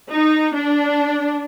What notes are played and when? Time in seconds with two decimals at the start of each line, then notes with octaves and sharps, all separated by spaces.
0.10 D#4
0.54 D4